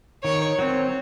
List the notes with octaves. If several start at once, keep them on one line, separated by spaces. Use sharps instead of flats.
D#3 C#5
F#3 C4